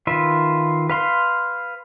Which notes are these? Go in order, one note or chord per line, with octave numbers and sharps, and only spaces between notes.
D#3 F4 B4 E5
B4 F5 C6